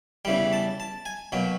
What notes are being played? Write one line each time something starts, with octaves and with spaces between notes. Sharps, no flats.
E2 C#3 E3 G3 G5
A5
A5
G#5
B2 F#3 A#3 G5